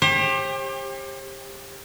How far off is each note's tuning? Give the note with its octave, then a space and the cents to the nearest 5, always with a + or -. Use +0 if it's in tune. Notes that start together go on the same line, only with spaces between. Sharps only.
G4 +20 C5 +45